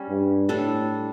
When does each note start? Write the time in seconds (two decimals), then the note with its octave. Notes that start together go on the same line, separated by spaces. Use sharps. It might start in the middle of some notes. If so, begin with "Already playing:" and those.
Already playing: G3 C#4
0.09 G2
0.49 A2 G3 D4 A4